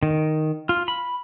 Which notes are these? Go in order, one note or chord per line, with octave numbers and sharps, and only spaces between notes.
D#3
F4
B5